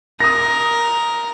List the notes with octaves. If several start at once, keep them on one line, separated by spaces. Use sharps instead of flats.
A#4 D#6 A#6